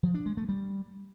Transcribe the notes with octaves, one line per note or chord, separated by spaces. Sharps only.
F3
D4
G#3
A3
G3